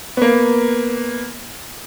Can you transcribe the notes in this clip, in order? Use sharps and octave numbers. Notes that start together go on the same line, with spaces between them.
A#3 B3